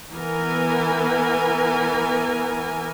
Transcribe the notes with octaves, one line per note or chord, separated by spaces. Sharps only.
E3 B3 A#4 G#5